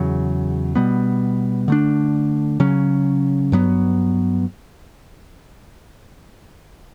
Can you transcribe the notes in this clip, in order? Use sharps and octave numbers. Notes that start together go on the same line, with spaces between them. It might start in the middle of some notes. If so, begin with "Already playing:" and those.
Already playing: E2 C#3 F#3
B2 G3 B3
D3 A3 D4
C#3 F#3 C#4
G2 F#3 B3